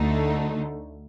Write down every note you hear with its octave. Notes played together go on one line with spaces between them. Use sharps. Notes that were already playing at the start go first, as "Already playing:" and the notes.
Already playing: D2 D3 A3 D#4